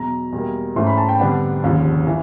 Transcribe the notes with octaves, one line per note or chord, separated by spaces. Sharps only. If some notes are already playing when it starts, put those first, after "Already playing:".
Already playing: E2 B2 F#3 A#5
E2 B2 G3 A#3
G#2 E3 A3 C#4 C6
B5
A5
G5
F2 D3 G3 B3 D4 F#5
F1 D#2 C#3 F3
E3